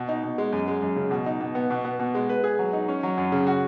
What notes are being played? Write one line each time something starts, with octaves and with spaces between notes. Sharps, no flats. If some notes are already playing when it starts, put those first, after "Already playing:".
Already playing: B2
D#4
B2
G#3
F#2
G#3
F#2
C#3
B2
D#4
B2
B3
B2
B3
B2
G#3
B4
G#4
F#3
D#4
C#4
F#3
F#2
C#3
F#4